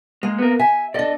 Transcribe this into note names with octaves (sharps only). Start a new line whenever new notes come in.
G#3 A#3
B3 A#4
E5 G#5
D4 A4 D5 D#5